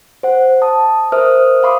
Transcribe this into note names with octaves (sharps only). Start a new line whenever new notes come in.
C5 F#5
A5 D#6
A#4 C5 E5 D#6 F6
F5 B5 C6 D6 D#6